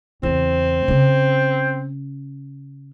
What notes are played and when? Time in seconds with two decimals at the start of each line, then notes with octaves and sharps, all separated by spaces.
0.23 E2 C#3 C4
0.88 C#3 C#4